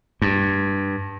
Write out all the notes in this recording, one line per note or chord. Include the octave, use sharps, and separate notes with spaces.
G2